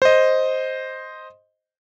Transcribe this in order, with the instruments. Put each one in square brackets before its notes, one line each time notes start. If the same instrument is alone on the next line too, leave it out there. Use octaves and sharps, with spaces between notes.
[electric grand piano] C5 D#5